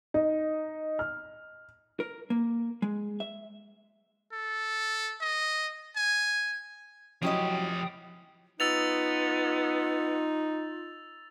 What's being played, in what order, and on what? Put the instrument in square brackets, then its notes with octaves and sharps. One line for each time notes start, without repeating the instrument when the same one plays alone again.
[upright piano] D#4
F6
[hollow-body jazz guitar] A#4
A#3
G#3
E5
[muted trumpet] A4
D#5
G#5
[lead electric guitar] F3 G4 [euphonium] F#3 [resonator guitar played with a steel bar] C#4 E4 D#5 [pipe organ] G5 D#6
[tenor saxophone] B3 [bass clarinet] D#4 [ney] F4 [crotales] E6 A6 F7